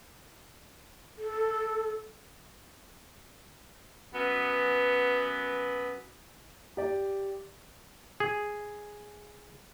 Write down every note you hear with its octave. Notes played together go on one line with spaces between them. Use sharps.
A4
F#2 B3
G4 D5
G#4